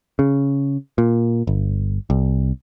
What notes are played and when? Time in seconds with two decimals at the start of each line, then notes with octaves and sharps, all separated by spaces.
0.19 C#3
0.98 A#2
1.47 G1
2.10 C2